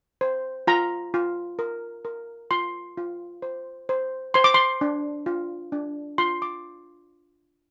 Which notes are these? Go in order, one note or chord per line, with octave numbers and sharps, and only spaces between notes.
C5
F4 A#5
F4
A#4
A#4
F4 C6
F4
C5
C5
C5 C6
D6
C6
D4
F4
D4
F4 C6
D6